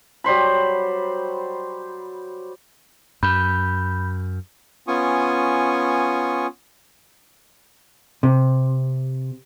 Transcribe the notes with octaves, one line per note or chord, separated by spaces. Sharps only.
F#3 G3 C5 B5
F#2 B5 G6
B3 C#4 F4 G#5 C#6 D#6
C3